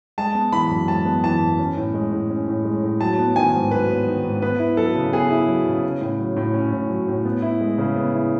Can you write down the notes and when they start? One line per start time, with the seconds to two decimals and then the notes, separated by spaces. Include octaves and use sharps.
0.18 G#3 A5
0.35 B3
0.52 E3 B5
0.70 F#2
0.88 G#3 A5
1.05 B3
1.24 E3 A5
1.41 F#2
1.59 C#4
1.77 A2
1.94 G#3
2.12 A2
2.30 C#4
2.48 A2
2.65 G#3
2.83 A2
3.01 F#3 A5
3.18 B3
3.36 D#3 G#5
3.54 G#2
3.71 F#3 B4
3.89 B3
4.07 D#3
4.24 G#2
4.42 B3 B4
4.59 E4
4.77 F#3 A4
4.95 C#3
5.13 B3 G#4
5.31 E4
5.48 F#3
5.66 C#3
5.83 C#4
6.01 A2
6.19 F#3
6.36 A2
6.54 C#4
6.72 A2
6.90 F#3
7.08 A2
7.25 B3
7.42 E4
7.61 G#3
7.78 C#3
7.96 B3
8.14 E4